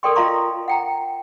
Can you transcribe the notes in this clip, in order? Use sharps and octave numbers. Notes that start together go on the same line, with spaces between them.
A4 A#4 D5 G5 C6 C#6
F4 D#5 F5 A#5 C6 C#6
F#5 G5 A#5